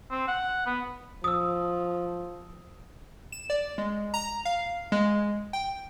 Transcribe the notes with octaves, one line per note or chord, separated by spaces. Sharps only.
C4
F#5
B3
F3 D#6 E6
E7
D5
G#3
A#5
F5
G#3
G5